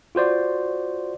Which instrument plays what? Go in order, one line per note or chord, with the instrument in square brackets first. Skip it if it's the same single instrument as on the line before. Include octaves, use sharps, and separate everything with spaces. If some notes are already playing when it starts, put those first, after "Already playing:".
[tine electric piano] F4 F#4 C5 D5